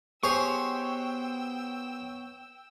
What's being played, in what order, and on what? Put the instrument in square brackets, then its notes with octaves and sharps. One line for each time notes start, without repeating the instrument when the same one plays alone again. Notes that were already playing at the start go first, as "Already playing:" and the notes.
[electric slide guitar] B3 C#5 [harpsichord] G4 G#4 C5 [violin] G5 E6 [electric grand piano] C#6